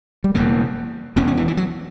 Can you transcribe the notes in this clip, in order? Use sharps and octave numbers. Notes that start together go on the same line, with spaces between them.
G3
E1 E2 C#3 A#3
E1 E2 B2 C#4
C#4
E3
E3
F#3